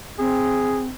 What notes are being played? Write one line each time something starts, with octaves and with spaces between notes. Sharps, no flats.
C4 G#4